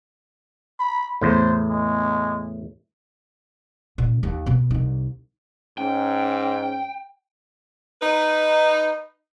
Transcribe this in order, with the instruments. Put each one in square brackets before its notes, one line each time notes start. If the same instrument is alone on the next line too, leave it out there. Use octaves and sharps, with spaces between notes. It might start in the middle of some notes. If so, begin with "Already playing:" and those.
[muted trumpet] B5
[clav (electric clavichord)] E2 A2 [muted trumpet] C5
[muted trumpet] G#3
[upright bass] A#2 C#4
D#2
B2 B3
C2 D#4
[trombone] G#2 [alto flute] C#4 [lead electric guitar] G5
[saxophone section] D#4 B4